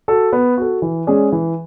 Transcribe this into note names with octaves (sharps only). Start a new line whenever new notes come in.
F#4 A4
B3
F#4 A4
E3
G#3 C#4 G#4 D5
E3